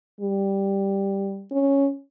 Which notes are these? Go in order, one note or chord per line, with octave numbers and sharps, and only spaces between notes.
G3
C#4